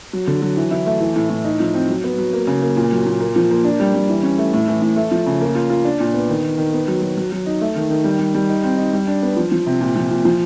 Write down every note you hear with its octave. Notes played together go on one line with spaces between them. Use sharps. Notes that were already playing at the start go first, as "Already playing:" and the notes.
F#3
D3
F#3
E3
E4
A3
E3
A2
A2
D#4
F3
C4
F#3
B3
F#3
A#3
C#3
A#3
A#2
F#3
A#2
A#3
F3
A#3
D4
G3
G3
E3
C#4
A3
A2
E3
A2
A3
F3
C#3
A#3
F4
F4
D4
A#2
B3
D#3
D#3
D#3
B3
F#3
F#3
F#3
F#3
D#4
A3
D#3
D#3
G3
G3
G3
D#4
C4
D#4
G3
D4
B3
F3
F3
C3
A#2
F3
A#2
F3